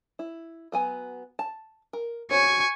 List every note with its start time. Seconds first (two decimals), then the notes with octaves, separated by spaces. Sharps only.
0.19 E4
0.72 F#3 B3 G#5
1.39 A5
1.93 A#4
2.31 F#4 C5 C#5 G#5 C#6